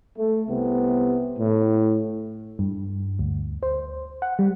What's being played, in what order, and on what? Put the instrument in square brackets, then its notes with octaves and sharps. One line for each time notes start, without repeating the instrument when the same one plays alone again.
[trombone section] A3
C2 C3 B3
A2
[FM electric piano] G2
D2
C5
F#5
G3